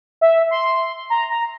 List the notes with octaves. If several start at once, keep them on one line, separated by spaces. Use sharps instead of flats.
E5
C6
A#5
A#5